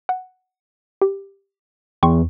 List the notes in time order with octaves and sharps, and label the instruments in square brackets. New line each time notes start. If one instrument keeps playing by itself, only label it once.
[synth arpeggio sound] F#5
G4
[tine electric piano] E2 [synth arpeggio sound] G5 C6 C#6